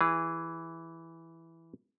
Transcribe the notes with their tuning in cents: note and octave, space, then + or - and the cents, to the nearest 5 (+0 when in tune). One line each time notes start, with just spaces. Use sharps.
E3 +0 G#4 -15